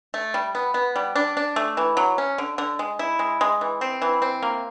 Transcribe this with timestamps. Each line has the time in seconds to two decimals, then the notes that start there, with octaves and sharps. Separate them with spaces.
0.14 A3
0.34 G3
0.55 B3
0.74 B3
0.96 G3
1.16 D4
1.37 D4
1.56 A3
1.77 E3
1.97 F#3
2.18 C#4
2.38 D3
2.58 D3
2.79 G#3
2.99 E4
3.19 G#3
3.41 G#3
3.61 E3
3.81 C4
4.02 E3
4.22 C4
4.43 A#3